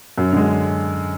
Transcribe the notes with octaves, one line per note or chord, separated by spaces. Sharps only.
F#2
D3 G#3